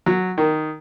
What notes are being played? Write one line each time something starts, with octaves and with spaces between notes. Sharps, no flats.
F#3
D#3